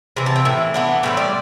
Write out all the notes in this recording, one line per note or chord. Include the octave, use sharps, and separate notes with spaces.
C3 E3
A5
G5
A2 E3
E3 B3 D4
A2 G3 C4 B4
D5